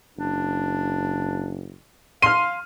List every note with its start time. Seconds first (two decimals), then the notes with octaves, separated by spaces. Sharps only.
0.17 F#1 D4
2.22 F5 C6 F6 D#7